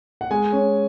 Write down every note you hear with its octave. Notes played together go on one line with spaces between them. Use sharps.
F#5
G#3 G#5
C#4